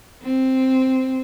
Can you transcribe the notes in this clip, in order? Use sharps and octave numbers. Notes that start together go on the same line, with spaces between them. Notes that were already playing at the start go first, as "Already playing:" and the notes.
C4